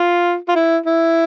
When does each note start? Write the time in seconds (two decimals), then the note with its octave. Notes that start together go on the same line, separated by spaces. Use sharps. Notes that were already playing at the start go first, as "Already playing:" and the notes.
Already playing: F4
0.48 F4
0.56 E4
0.86 E4